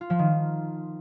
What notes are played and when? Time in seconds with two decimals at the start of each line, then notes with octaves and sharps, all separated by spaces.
0.01 F4
0.10 F3
0.19 D#3